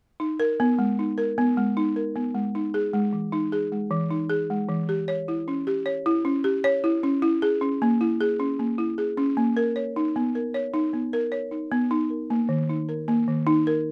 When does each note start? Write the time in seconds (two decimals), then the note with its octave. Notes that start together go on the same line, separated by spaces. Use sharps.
0.20 D#4
0.40 A#4
0.60 B3
0.79 G#3
0.99 D#4
1.18 A#4
1.38 B3
1.57 G#3
1.77 D#4
1.96 A#4
2.16 B3
2.34 G#3
2.55 D#4
2.74 G#4
2.93 G#3
3.13 E3
3.32 D#4
3.52 G#4
3.72 G#3
3.91 E3
4.11 D#4
4.30 G#4
4.50 G#3
4.69 E3
4.89 G4
5.08 C#5
5.28 E4
5.48 C#4
5.67 G4
5.86 C#5
6.06 E4
6.25 C#4
6.44 G4
6.64 C#5
6.84 E4
7.03 C#4
7.22 E4
7.42 G#4
7.61 C#4
7.82 A#3
8.01 E4
8.21 G#4
8.40 C#4
8.59 A#3
8.78 E4
8.98 G#4
9.17 C#4
9.37 A#3
9.57 A#4
9.76 C#5
9.96 D#4
10.16 B3
10.35 A#4
10.54 C#5
10.74 D#4
10.93 B3
11.13 A#4
11.32 C#5
11.51 D#4
11.72 B3
11.91 D#4
12.10 A#4
12.30 A#3
12.49 D#3
12.70 D#4
12.89 A#4
13.08 A#3
13.28 D#3
13.47 D#4
13.67 A#4